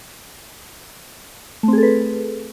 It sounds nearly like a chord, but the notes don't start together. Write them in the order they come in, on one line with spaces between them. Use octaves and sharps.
A3 C4 G#4 A4 B4